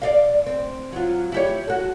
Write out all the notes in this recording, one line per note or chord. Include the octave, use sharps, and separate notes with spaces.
D5 D#5 F5
C4
F#3 F4
E4 G4 C#5
F#4 A4